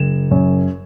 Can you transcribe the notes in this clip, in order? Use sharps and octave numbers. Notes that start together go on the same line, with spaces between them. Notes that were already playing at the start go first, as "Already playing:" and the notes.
Already playing: F#1 E7
F#2